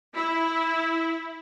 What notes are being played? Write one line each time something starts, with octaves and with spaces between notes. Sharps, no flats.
E4